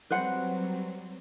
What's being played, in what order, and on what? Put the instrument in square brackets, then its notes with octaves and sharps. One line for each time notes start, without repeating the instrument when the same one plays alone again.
[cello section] F#3 G3 C4 [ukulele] B4 C5 F#5